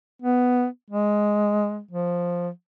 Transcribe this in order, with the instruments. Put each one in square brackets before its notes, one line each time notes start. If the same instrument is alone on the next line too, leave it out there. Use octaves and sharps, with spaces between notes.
[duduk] B3
G#3
F3